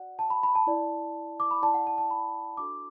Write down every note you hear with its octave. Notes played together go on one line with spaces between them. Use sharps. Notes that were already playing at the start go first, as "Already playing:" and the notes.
Already playing: F#4 D5 F#5
A5
B5
B5
A5
E4 D5
D6
B5
E4 D5 A5
F#5
A5
A5
B5
D4 F#4 A4 D6